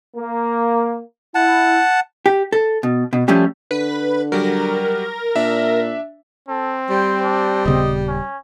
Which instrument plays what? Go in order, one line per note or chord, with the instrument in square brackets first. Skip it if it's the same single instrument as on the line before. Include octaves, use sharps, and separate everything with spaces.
[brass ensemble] A#3
[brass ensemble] E4 [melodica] F#5 A5
[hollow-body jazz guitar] G4
A4
B2
B2
F3 G3 A3 C#4 G4
[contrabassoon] D3 [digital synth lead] B4
[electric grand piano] F#3 G3 [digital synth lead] A#4
[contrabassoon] A#2 [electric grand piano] D4 E5
[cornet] C4 [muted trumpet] A4
[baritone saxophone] G3 [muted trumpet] C5
[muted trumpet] D4
[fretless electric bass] D#1 C#3 B3 [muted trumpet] D#5
[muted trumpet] C#4